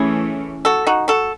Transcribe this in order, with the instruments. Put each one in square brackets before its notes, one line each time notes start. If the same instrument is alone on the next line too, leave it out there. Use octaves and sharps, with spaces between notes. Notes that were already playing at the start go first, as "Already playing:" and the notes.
Already playing: [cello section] E3 A3 C#4 [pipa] E4 G#4
[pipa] F#4 A4
D#4 F#4
F#4 A4